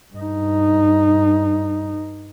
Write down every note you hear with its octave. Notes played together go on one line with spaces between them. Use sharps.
G2 D#4